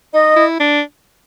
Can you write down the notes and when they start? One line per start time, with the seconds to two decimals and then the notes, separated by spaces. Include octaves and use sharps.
0.14 D#4 D#5
0.36 E4
0.60 D4